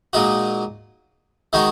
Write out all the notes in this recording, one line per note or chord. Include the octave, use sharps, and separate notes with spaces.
A#2 G#3 D#4 F#4
D#3 G#3 D#4 F#4